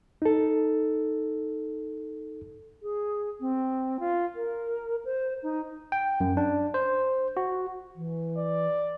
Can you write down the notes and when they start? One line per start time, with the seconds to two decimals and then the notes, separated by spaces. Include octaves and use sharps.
0.22 D#4 A4
2.82 G#4
3.40 C4
3.99 F4
4.36 A#4
5.05 C5
5.43 D#4
5.92 G5
6.20 F#2
6.37 D4
6.74 C5
7.37 F#4
7.95 E3
8.38 D5